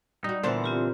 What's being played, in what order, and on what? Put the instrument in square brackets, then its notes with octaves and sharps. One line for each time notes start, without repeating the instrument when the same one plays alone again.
[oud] G3 F#4 [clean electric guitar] D#4
[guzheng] A#2 C5 A5 [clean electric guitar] D3 E3 [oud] B3
[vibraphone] C4 F4 G4